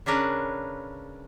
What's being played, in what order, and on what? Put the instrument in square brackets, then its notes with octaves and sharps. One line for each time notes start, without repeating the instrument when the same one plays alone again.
[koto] C#3 C#4 D4 A#4 B4